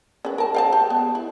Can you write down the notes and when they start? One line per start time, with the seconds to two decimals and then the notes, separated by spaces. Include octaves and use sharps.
0.25 C#4 B4
0.38 A#4 A5
0.55 F5 G5 A5
0.73 G4
0.90 B3
1.15 E4